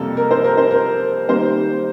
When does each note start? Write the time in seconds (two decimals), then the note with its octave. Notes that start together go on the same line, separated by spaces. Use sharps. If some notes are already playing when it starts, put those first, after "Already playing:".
Already playing: F2 C3 G3 A#3 A4
0.17 A#4
0.31 C5
0.44 A#4
0.57 C5
0.71 A#4
1.29 D#3 G3 A#3 C5